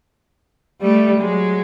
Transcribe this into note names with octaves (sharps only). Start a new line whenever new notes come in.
G3 A3
F#3 G#3